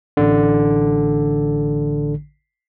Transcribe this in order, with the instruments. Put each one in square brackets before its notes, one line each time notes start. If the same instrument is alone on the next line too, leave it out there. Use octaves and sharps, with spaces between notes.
[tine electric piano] A1 D3